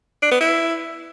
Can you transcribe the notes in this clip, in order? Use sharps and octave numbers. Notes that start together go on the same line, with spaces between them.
D4
B3
E4